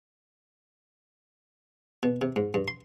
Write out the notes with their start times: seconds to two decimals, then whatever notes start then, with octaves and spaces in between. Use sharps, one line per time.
2.03 B2
2.22 C3
2.36 G#2
2.54 G2
2.68 C6